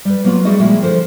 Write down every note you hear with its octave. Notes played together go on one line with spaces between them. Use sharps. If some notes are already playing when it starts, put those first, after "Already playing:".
G3 B4
F#3 A#3 B3 D4 F4 F#4
G3 A3 F#4 G#4 D5 D#5
A#2 F3 G3 G#3 E4 G5
D3 F3 F4 A4 C5